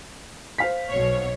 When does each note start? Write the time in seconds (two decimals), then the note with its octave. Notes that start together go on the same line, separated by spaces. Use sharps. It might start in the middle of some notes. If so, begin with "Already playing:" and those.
0.58 C5 F5 B6
0.89 B1 B2 C#5